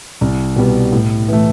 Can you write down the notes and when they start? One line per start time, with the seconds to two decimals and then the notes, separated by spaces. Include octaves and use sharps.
0.21 C2
0.56 B2 G3 B3
0.92 A2
1.28 E3 A3